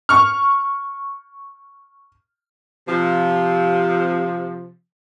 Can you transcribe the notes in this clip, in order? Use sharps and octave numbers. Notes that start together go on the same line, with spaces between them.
C#6 F6
C3 F3